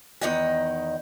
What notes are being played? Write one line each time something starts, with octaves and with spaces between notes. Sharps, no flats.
E2 D#3 D#4 D#5 F#5 G5